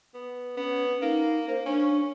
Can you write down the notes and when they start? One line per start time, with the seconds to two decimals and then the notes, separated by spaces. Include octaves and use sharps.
0.14 B3
0.57 B3 C#4
1.02 A#3 D#4
1.48 A#3 C5
1.66 C#4 D4